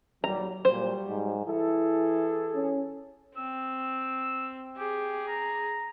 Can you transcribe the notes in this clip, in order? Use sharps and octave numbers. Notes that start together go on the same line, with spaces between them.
D#2 A#2 F#3 G3 A#5
A#2 F#3 G3 C5
G#2
E3 E4 G#4 A4
C#4
C4 E6
G4 G#4
A#5